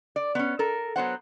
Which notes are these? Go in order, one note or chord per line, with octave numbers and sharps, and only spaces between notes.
D5
B3 C#4
A4 A#4
F#3 B3 C5 F#5